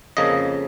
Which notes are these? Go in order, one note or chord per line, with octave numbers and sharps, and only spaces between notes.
F2 C#3 F3 A#3 D#5